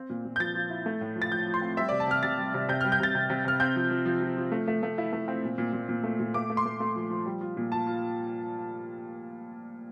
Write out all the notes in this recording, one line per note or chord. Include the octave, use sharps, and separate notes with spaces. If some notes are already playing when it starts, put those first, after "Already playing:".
Already playing: C4
A#2
A#2
G6
F3 A6
F3
E4
A3
A2
F3
A6
F3 G6
F3
C6
C4
G3 E5
C3 D5
A5
C3 F6
C3 A6
G3
C3
C3 G6
G3 F6
G6
C3 A6
C3
C3
C3 F6
C4 G6
F3
F3
F3
F3
F3
A3
A3
A3
E4
A3
C4
A#2
A#2
A#2
A#2
A3
A#2
A3 D6
A3
C6
A3
A3
F3
F3
G3
F4
A#2
F4 A5
F4